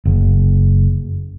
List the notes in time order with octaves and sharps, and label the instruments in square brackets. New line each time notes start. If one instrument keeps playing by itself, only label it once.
[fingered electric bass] F#1